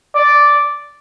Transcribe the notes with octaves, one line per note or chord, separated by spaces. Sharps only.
D5